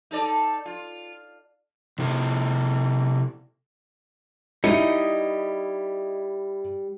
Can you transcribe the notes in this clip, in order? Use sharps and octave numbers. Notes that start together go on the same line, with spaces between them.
D#4 A4 D5
F4
C3 E4 A4
G3 D#4 E4 D#5 C#7